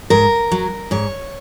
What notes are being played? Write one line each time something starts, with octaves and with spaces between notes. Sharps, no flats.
G#2 A#4
F#3
G#2 C#5